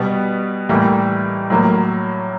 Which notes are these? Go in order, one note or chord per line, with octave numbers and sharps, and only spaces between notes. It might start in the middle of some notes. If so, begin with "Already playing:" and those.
Already playing: B2 G3 B3
A2 E3 G3 A#3
A2 F#3 A#3